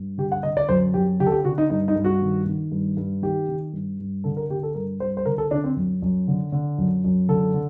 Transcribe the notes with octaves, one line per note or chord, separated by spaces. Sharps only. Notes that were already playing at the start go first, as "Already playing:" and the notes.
Already playing: G2
D3 G4
F#5
D3 D#5
D5
F#2 C5
F#2 G4
D3 G4
A4
G4
D3 F#4
D#4
G2 D#4
D#4
G2
F#4
D#3
D#3
G2
G2
D#3 G4
D#3
G2
G2
D3 A4
A#4
D3 G4
A4
G2 A#4
G2 C5
C5
D3 A#4
A4
D3 D4
C4
F#2
F#2
D3
D3
F#2
F#2
D3 A4
D3